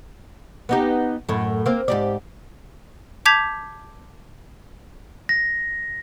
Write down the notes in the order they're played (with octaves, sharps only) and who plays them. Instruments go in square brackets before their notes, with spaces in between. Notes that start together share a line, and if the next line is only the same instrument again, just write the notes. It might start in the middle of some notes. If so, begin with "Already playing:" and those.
[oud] B3 D#4 G4
F#2 A2
A#3 C4
G#2 G4 D5
[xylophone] A5 D6 G6 G#6 B6 F7
[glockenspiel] A#6